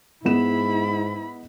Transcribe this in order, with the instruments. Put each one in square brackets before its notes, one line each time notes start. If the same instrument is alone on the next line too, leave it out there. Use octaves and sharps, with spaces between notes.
[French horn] G#2 [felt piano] G#3 B3 E7 [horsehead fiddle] E4 B5